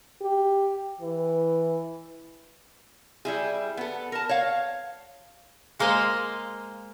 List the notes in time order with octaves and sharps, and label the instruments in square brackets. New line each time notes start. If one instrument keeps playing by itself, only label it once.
[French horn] G4
E3
[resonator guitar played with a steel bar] G3 E4 G#4
B3 A4
A#4 A5
C#5 F5
[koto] G#3 A#3 C5 D#5 F5